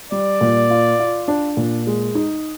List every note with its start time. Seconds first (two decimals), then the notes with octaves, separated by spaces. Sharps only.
0.12 G3 D5
0.41 A#2
0.70 F4
1.00 F4
1.28 D4
1.57 A#2
1.87 G#3
2.15 D#4